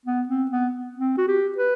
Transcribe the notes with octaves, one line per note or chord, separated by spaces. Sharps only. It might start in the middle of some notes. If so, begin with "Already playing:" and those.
B3
C4
B3
C4
F#4
G4
B4